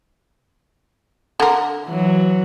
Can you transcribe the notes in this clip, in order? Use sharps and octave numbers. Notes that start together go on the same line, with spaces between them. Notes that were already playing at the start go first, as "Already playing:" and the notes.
D3 A#4
E3 F#3